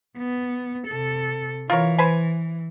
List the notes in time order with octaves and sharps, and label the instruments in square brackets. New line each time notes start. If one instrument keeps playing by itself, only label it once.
[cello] B3
C3 A4
[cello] E3 [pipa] F4 A#4 C#5
[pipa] B4 C5 G#5